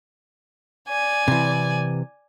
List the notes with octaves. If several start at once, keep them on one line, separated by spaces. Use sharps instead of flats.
D5 G#5
C3 E3